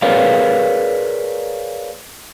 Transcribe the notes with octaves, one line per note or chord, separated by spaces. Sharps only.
G#4 A#4 B4 C#5 D5 F5